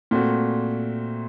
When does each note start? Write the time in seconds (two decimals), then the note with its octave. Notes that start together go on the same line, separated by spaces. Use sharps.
0.11 A#2 A3 C4 F#4